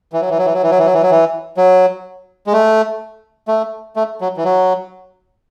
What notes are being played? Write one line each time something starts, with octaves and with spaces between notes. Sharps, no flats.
E3
F#3
E3
F#3
E3
F#3
E3
F#3
E3
F#3
E3
F#3
E3
F#3
G#3
A3
A3
A3
F#3
E3
F#3